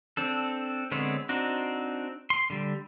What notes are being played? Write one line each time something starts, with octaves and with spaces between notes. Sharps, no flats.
C4 D4 A4
D3 G#3 B3 C4 C#5
C4 D4 D#4 F#4
C6
D3 G3